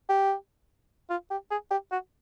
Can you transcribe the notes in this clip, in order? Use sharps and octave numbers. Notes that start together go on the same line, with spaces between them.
G4
F4
G4
G#4
G4
F#4